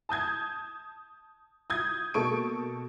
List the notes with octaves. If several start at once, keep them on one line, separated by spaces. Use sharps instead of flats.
A5 D#6 G6 G#6
D#6 G6 G#6
B2 A#3 A4 C#6 D7